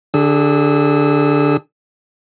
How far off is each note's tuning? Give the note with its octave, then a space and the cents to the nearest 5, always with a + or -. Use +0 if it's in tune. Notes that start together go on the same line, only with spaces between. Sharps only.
D3 +0 G#4 -40 E6 -25